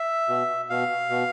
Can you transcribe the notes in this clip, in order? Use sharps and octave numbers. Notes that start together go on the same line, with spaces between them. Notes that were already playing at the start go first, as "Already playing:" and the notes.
Already playing: E5
B2
B2 F5
B2